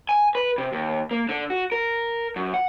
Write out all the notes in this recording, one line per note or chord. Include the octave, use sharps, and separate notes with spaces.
G#5
B4
C3
D#2
A#3
D3
F#4
A#4
F#2
F#5